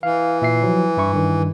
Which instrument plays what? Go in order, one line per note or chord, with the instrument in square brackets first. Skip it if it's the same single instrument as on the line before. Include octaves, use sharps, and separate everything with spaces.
[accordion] E3 [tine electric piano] F5
[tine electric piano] A#2 E5 C7
F3 F#3
G2 E4 C#6
G2 D#3